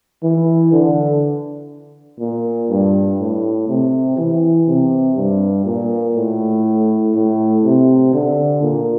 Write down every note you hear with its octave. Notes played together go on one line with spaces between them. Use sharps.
E3
D3
A#2
G2
A2
C3
E3
C3
G2
A#2
A2
A2
C3
D3
A#2